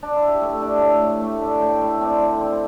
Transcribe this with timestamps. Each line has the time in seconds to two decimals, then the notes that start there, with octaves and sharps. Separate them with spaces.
0.03 D4
0.16 E4
0.28 G4
0.41 A3 A4
0.62 D4 D5
0.81 A2 E5
1.02 A2
1.21 A3
1.42 D4
1.61 A2 G5
1.81 A2 E4
2.01 C4 D4
2.22 D3
2.41 C4